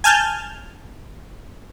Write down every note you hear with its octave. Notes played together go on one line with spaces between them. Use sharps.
G#5 A5 F6 G6